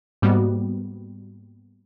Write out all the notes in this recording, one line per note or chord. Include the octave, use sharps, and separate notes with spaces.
G#2 G3 A#3 B3 F#4